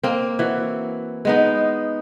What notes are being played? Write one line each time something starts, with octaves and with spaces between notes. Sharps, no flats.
A#3 C4
E3 F#4
G#3 B3 D#4